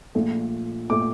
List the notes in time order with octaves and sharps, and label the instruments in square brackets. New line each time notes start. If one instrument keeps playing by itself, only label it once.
[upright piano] A#1 A#2 A3
A#2 A3 D6